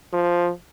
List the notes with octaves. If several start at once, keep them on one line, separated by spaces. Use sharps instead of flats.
F3